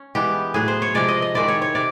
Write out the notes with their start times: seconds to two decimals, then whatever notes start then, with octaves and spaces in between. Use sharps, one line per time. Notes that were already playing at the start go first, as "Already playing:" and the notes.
Already playing: C#4
0.15 E3 G#3 B3 G4
0.54 A2 F#3 B3 G#4
0.68 C5
0.82 C#5
0.94 C3 F3 G#3 D5
1.08 D#5
1.22 D#5
1.35 D#3 G#3 C4 E4 D5
1.48 C#5
1.62 C#5
1.75 C3 D5